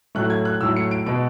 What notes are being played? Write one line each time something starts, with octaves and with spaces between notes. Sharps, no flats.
A2 F#3 A3 F#6
G#6
F#6
A2 F#3 A3 E6
C#7
D7
B2 G#3 B3 D7